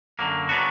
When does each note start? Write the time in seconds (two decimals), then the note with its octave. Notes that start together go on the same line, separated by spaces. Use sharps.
0.19 F#2 D3 F#3 A#3
0.49 C#3 F#3 B3 D4 F#4